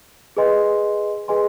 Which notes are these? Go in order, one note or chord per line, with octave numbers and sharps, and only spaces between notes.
G#4 B4 D#5 G#5 C6
G#4 B4 D#5 G#5 C6